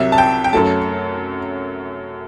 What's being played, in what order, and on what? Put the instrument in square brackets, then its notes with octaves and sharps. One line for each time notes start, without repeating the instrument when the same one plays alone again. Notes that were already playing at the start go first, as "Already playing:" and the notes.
Already playing: [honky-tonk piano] C2 C3 F#3 E5
A5
G5
G5
F#2 F#3 A3 A5